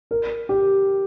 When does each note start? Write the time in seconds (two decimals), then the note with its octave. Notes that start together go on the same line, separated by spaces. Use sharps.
0.11 A#4
0.49 G4